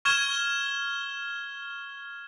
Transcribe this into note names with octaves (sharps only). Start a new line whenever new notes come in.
C#6 F6 G#6 E7 G7